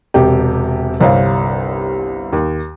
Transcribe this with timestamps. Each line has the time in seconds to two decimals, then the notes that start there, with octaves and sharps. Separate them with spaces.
0.14 E1 C3 G4
1.00 G1 C2 G3 C5 C#5 F5
2.33 D#2